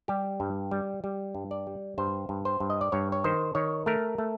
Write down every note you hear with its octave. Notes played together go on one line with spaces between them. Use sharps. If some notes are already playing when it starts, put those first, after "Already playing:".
G3 G4
G2
G3
G3
G2
D5
G3
G2 C5
G2
C5
G2
D#5
D5
G2 C#5
C#5
D#3 C5
D#3 C#5
A3 A#4
A3